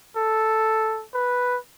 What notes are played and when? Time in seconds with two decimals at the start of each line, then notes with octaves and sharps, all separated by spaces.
0.17 A4
1.14 B4